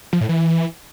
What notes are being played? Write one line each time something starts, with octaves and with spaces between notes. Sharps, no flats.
F3
A2
E3